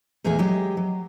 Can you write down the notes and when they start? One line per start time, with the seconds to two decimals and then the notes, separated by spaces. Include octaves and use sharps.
0.24 E2 A#2 A3 B3 G#4 D#5
0.39 F#3 G#3 G4 D#5
0.77 F#3